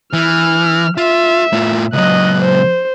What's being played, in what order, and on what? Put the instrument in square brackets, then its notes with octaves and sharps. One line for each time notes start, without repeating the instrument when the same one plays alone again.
[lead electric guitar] E3 [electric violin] F6
[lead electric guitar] F4 [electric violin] E5
[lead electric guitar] A2 F4
[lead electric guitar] C#2 F#3 [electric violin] D#5 F#6
[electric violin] C5